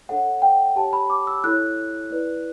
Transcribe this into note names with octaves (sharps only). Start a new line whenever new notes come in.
D4 A4 C#5 F#5
G5
G4 C#5 A5
B5
D6
E6
E4 A4 C#5 F#6
E4 B4 D5